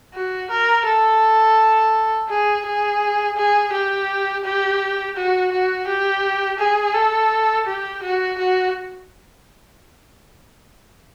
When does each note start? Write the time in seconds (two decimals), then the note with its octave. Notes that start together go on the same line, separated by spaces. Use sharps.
0.14 F#4
0.50 A#4
0.85 A4
2.29 G#4
2.66 G#4
3.37 G#4
3.72 G4
4.44 G4
5.16 F#4
5.52 F#4
5.87 G4
6.59 G#4
6.94 A4
7.66 G4
8.03 F#4
8.38 F#4